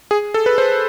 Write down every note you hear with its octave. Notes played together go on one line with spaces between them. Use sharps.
G#4
A4
B4
C5